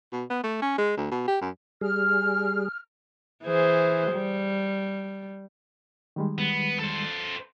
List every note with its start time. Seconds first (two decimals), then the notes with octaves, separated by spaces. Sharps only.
0.12 B2
0.30 B3
0.44 A3
0.62 C#4
0.78 G#3
0.97 D2
1.11 B2
1.28 G4
1.41 F#2
1.81 G3 G#4 F6
3.44 E3 G#4 C5
4.13 G3
6.16 D#3 G3 G#3
6.38 B3
6.80 A4 C5